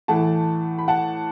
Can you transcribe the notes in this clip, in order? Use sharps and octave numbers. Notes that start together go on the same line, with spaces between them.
A2 E3 A3 F#5 A5
B5
F#5 A5